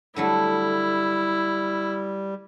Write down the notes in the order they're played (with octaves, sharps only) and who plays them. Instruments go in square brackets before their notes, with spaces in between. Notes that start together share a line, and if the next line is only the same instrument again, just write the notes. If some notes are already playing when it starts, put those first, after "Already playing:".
[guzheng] D3 F#3 A3 [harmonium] G3 [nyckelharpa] E4